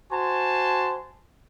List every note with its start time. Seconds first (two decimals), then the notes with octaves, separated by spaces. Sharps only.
0.12 F#4 C5 G#5 A5 C6